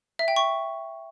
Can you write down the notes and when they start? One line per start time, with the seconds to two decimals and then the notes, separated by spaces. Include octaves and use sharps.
0.19 E5
0.28 G5
0.36 C#6